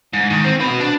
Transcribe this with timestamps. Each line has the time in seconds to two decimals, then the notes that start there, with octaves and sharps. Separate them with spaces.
0.13 G#2
0.30 D#3
0.44 C4
0.60 F#4 B4
0.80 D4